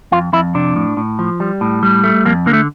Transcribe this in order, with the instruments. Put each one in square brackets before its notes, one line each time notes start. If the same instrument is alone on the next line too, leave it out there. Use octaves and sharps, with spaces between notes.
[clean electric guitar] F2 F4
F2 E4
C3 D4
A2
A2
F3
G3
A2
G3
A3
F2 A#3
D3 A#3
A3